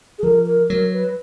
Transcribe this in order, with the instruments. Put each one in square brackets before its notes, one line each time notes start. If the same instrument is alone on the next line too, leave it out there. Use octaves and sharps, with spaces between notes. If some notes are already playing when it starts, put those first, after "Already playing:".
[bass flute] G#4
[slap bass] F3 [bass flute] A#4
[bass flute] A#4
[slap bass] F#3 [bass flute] A#4
[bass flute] B4